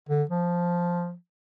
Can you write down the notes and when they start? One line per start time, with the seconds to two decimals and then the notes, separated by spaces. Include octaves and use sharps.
0.09 D3
0.30 F3